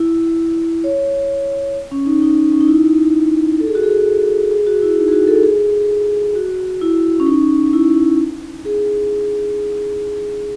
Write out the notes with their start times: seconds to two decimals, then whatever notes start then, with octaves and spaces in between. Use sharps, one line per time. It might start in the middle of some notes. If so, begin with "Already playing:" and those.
Already playing: E4
0.84 C#5
1.91 C#4
2.06 D#4
2.22 D#4
2.52 C#4
2.60 D#4
2.67 E4
3.60 A4
3.67 G#4
3.75 F#4
3.83 G#4
4.51 G#4
4.67 F#4
4.82 E4
4.98 D#4
5.08 G#4
5.13 F#4
5.27 A4
5.43 G#4
6.35 F#4
6.82 E4
7.20 C#4
7.27 D#4
7.73 E4
8.65 G#4